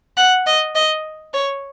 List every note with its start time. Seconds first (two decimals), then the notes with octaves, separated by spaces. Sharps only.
0.17 F#5
0.46 D#5
0.75 D#5
1.34 C#5